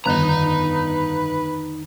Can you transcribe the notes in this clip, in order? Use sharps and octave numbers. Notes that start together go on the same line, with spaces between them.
G1 F2 D3 D#3 D#4 B4 A#5